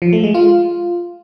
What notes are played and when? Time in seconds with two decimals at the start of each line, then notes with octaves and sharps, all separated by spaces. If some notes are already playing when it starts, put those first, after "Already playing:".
0.02 F3
0.13 A3
0.24 G#3
0.34 F4